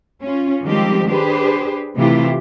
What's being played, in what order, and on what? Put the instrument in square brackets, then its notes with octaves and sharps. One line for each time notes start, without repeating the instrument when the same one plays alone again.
[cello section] C#4 F4
D#3 F3 G3 G#3 C4 G4
D4 G4 G#4 B4 C5
C3 E3 A3 E4 F4 G4